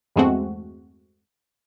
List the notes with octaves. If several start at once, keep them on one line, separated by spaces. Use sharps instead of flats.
E2 G2 G#3 A3 C4 F#4